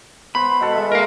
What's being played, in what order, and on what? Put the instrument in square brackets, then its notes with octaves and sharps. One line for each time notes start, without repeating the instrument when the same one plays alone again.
[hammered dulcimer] B3 C5 [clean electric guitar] B5
[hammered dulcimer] B2 A4
G#3 E5
[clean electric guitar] A#4 F5